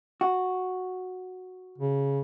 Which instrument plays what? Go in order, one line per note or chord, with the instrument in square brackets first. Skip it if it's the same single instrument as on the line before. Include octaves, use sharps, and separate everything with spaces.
[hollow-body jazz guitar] F#4
[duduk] C#3